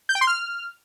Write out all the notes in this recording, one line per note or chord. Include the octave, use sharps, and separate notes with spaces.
G6
G5
C6
F6